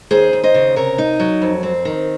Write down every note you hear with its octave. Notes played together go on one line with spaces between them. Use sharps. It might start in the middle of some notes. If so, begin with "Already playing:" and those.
D#2 G#4 C5
D#2
C5 D#5
C#3
C3 A#4 C#5
D#4
F#3
F2
C4
D#3